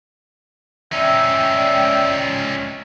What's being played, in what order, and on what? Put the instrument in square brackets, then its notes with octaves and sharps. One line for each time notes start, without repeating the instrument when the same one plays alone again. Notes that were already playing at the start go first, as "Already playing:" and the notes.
[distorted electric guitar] C#4 D#4 [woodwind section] D5 G5 [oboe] E5